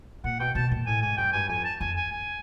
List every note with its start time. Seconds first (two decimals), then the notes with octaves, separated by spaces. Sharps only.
0.24 A#2 F#5
0.40 B2 G5
0.55 B2 A5
0.71 A#2
0.87 A2 G#5
1.02 G#2 G#5
1.17 F#2 G5
1.33 G2 G#5
1.49 F2 G#5
1.64 A5
1.80 F2 G#5
1.96 G#5
2.12 G#5